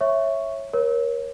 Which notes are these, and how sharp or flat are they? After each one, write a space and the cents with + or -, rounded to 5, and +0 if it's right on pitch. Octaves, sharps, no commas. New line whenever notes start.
C#5 -10 E5 +0 C#6 +0
A#4 +30 C#5 -10